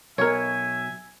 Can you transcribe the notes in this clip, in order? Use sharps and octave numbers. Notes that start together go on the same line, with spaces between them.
B1 B2 A#4 C#5 E5 G#5